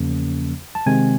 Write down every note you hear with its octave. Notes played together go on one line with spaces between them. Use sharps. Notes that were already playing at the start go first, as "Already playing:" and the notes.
Already playing: E2 C#3 F3 A#3 C#4
A5
C3 D#3 G#3 C4 G#5